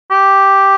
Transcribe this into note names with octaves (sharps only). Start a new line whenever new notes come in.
G4